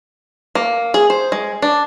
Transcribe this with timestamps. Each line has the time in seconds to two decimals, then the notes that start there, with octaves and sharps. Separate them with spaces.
0.55 A#3
0.94 G#4
1.10 C5
1.32 G#3
1.62 D4